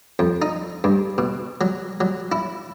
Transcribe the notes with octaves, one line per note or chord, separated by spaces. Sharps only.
F2
D#4
G2
B2
F#3
F#3
E4